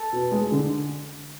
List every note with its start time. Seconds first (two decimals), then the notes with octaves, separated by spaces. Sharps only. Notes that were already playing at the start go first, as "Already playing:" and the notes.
Already playing: A4
0.13 B2
0.32 G#3
0.52 D3